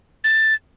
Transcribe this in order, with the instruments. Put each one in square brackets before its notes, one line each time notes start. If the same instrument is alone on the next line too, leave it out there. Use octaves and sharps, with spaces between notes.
[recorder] A6